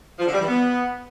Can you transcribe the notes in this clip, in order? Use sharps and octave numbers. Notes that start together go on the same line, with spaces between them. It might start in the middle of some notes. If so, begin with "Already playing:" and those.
F3
D3
G3
E3
B3